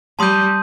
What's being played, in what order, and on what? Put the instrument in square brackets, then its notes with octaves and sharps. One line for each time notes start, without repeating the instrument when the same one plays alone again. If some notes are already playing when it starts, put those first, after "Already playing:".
[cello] G3 [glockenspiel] A5 C6 D#6 G6 D#7